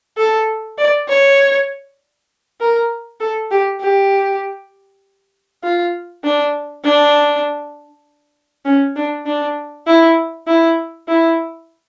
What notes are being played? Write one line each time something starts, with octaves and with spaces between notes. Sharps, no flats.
A4
D5
C#5
A#4
A4
G4
G4
F4
D4
D4
C#4
D4
D4
E4
E4
E4